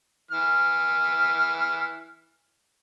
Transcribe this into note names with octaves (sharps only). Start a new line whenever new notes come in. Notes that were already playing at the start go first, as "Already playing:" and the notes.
E3 F6